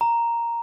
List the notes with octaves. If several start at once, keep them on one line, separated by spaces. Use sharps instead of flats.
A#5